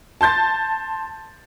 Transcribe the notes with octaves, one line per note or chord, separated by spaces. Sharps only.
A5 C6 G6 A6